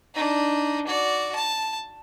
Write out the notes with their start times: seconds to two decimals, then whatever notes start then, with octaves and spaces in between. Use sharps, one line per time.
0.14 D4 D#4
0.87 F#4 D5
1.35 A5